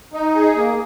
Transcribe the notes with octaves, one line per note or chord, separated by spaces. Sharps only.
D#4
G#4
A#3